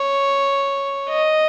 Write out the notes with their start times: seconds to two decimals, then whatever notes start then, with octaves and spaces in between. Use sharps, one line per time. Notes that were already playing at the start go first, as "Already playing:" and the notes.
Already playing: C#5
1.10 D#5